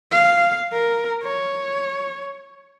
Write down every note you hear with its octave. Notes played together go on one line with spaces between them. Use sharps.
F5
A#4
C#5